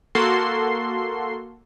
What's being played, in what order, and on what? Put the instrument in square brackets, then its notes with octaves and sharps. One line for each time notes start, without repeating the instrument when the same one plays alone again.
[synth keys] A#3 F#4 A4 C6 C7